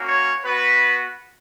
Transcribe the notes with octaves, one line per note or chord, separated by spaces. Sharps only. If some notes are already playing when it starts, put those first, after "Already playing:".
Already playing: A#3 C#4 F#4
C#5
B3 F#4 B4